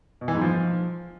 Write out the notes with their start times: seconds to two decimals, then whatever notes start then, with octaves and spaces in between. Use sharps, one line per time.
0.21 B2
0.28 E3
0.35 G#2
0.41 F3